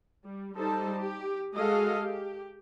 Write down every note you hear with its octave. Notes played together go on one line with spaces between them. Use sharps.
G3
G3 D#4 A4 C5 A5
G4
G#3 F#4 G#4 A4 D#5 F5
G4